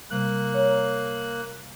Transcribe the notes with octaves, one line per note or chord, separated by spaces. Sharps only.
C3 G3 A#3 F#6
C#5 A#5